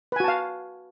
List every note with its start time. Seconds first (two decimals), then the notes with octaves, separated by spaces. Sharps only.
0.12 B4
0.16 G#5
0.20 F#4
0.24 A5
0.28 F5